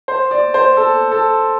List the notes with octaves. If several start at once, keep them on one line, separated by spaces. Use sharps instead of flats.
C5
D5
C5
A4
A4